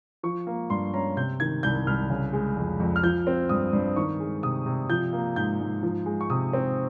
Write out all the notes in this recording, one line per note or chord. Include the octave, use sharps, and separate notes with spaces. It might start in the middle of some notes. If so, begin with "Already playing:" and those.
F3 C#6
A#3
G2 C6
C#4 A#5
C3 G6
D#3 G#6
C2 G6
C2 F6
C#3
G#3
F2
F2
F6
F3 G6
C4
G2 D#6
G2
D#3 C#6
G#3
C3 D#6
C3
F3 G6
A#3
G#2 G6
G#2
F3
G#3
C#6
C3 D#6
C4